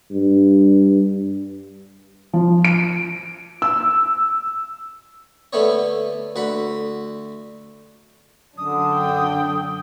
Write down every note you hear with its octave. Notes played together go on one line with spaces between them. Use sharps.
G2
F3
D7
E6
D3 A3 B3 C#5
D2 F#5 B5
F#2 D3 D4 D#6
G5